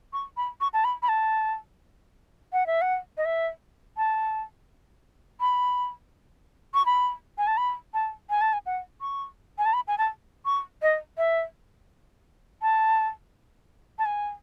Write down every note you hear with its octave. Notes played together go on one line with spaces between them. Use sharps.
C#6
B5
C#6
A5
B5
B5
A5
F#5
E5
F#5
D#5
E5
A5
B5
C#6
B5
G#5
A5
B5
A5
G#5
A5
G#5
F#5
C#6
G#5
A5
B5
G#5
A5
C#6
D#5
E5
A5
A5
G#5